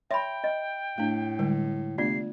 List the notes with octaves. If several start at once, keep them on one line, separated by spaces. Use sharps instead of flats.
C#5 E5 G5 B5 C6
D#5
A2 A3 D4
D3 G3 G#3
C3 A3 B3 D4 F4 D5 C7